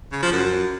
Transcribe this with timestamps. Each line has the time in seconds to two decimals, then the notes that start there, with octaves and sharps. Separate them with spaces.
0.12 C#3
0.22 F3
0.33 F#2